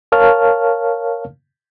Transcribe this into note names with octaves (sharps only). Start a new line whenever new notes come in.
A#4 C#5 F5 A5 F6